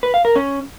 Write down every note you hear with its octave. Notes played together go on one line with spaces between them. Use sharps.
B4
F5
A#4
C#4